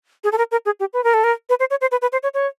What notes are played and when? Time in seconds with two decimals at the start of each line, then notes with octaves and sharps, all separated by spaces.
0.24 G#4
0.32 A4
0.38 A#4
0.52 A#4
0.66 G#4
0.80 G4
0.93 B4
1.04 A#4
1.14 A4
1.24 A#4
1.49 B4
1.60 C5
1.70 C#5
1.81 C5
1.91 B4
2.02 B4
2.12 C5
2.23 C#5
2.34 C#5